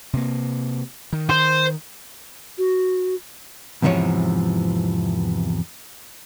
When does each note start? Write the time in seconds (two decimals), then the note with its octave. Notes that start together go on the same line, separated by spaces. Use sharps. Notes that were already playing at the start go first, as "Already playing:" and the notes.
0.13 C3 A#3
1.13 D#3
1.29 C5
2.58 F#4
3.82 E2 G#2 C3 E3 F3 C#5